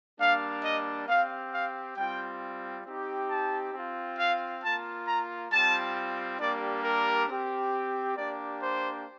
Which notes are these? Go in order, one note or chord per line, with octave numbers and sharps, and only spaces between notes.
G3 A#3 D4 F5
D#5
C4 G4 F5
F5
G3 C4 F4 G5
C4 D#4 G4
A5
C4 F4
F5
A#3 F4 A5
A#5
G3 C4 F4 A5
G3 A#3 D4 G4 D5
A#4
C4 G4
A#3 D4 G4 D5
C5